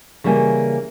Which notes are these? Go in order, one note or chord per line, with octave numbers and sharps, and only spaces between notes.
C#3 E3 G3 A#3 F5 G#5